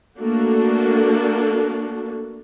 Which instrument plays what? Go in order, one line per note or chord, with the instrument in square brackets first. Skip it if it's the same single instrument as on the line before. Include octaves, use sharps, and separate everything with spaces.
[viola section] A3 A#3 D4 F#4 A4